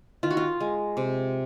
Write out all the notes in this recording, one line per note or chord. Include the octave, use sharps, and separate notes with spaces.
D#3 F4
F#4
F4
G#3
C3